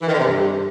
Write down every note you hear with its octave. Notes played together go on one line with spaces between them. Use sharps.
E3
D#3
D3
C3
G2